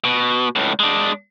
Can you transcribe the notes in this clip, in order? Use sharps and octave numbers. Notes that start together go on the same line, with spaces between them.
B2
C#2 A2
G#3 D4